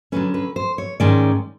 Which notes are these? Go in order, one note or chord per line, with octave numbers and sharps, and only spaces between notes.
D3 F#3 A3 C#4 B4
B4
C5
C#5
G#2 D#3 G#3 C#4 D5